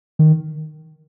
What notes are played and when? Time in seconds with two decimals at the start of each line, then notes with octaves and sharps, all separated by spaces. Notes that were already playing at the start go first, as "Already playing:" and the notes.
0.19 D#3